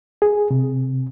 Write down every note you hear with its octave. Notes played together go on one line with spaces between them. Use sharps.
G#4
C3